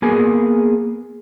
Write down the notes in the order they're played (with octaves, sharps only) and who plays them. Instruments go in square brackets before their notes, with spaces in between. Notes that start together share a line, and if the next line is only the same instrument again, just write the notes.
[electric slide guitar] A#3 B3 G#4 G#5